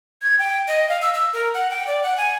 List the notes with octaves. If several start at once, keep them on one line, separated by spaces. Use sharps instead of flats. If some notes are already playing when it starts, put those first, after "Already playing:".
G#6
G5
D#5
F5
E6
E6
A#4
F#5
G5
D5
F#5
G#5